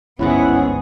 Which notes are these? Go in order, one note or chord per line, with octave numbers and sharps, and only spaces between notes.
G1 C#2 G#2 B3 C#4 E4 G#4 F#5